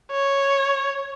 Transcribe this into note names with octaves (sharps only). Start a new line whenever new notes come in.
C#5